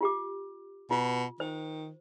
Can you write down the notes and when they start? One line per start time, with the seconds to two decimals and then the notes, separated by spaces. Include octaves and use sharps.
0.01 F4 G4 D6
0.91 B2 F4
1.40 D#3 C5